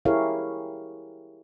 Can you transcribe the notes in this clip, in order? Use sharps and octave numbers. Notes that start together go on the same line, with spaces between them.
E4 G4 G#4 A#4 C#5 F5